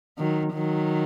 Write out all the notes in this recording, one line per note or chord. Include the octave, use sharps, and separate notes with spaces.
D#3 F#3
D#3 F#3